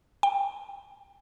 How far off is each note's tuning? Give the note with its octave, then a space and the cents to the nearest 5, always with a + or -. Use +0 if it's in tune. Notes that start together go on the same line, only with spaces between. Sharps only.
G5 +25